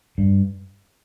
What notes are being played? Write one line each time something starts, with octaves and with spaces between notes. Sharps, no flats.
G2